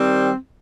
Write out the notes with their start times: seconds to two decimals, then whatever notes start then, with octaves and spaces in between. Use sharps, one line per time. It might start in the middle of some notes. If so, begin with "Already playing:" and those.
Already playing: D#3 G3 C4